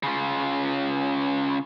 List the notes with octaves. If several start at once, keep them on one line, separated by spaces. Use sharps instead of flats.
C#3 F4